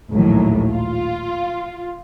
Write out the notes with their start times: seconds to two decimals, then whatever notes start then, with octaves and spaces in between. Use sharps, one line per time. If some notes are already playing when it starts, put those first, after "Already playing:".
0.10 A#1 D#2 A2 F#3
0.72 F4